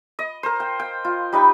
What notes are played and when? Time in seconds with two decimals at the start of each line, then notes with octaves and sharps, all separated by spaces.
0.19 D#5
0.43 A#4 C5
0.60 G5
0.80 G5
1.05 F4
1.32 G3 D#4 B4 G5